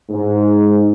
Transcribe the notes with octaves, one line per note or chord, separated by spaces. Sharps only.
G#2